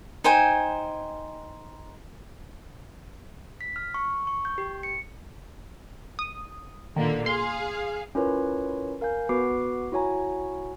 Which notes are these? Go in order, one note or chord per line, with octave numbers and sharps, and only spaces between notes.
D#4 C5 G5 G#5
B6
F6
C#6
C#6
G6
G4
C#7
D#6
A#2 D3 D#3 A#3
G#4 F5 C6
C#4 E4 F4 A#4 B4 C#5
A#4 F5 G#5 G6
B3 F#4 B4 B5 D6 C7
E4 F#4 C#5 G#5 A#5